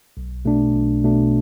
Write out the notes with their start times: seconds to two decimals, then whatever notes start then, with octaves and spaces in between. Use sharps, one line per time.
0.17 B1
0.45 B2 A3 D4
0.74 B1
1.04 B2 A3 D4